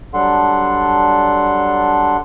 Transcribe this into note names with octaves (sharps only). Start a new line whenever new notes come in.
F#3 G3 D4 A4 F#5 C6